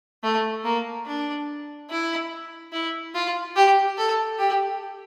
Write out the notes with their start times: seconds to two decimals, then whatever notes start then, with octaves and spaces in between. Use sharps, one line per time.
0.24 A3
0.65 A#3
1.06 D4
1.90 E4
2.72 E4
3.15 F4
3.56 G4
3.98 A4
4.39 G4